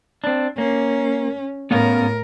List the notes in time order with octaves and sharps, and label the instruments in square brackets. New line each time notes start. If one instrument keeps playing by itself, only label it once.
[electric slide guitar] C4 D4
[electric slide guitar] A#3 [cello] C#4
[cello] A2 A#4 [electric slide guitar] B3 C#4 F5